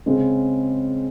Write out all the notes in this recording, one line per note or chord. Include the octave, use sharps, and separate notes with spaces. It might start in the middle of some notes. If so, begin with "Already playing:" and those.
C#3 G#3 C4